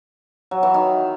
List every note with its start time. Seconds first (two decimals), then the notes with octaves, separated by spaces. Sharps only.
0.51 F#3
0.63 E3
0.74 D#3